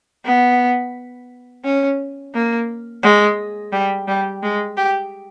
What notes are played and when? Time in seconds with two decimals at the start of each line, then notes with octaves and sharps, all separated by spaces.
0.25 B3
1.65 C#4
2.34 A#3
3.03 G#3
3.73 G3
4.08 G3
4.43 G#3
4.77 G4